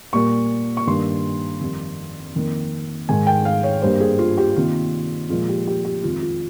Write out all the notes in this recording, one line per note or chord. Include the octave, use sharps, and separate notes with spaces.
A#2 G3 A#3 C#6
C#6
G2 D#3 A#3 C6
F2 D#3 G3
F2 D#3 A#3
G#2 D#3 G#3 G#5
G5
F5
C#5
G2 G3 A#3 C5
G#4
F4
G4
C3 D#3 A#3 F4
A#2 F3 G#3 F4
G4
G4
G4
F2 D#3 G#3 F4
F4